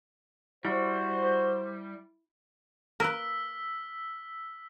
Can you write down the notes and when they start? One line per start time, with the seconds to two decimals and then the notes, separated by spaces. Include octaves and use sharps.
0.65 G3 E4 F#4 C5
3.00 A#3 A#4 B4 E6 F6 B6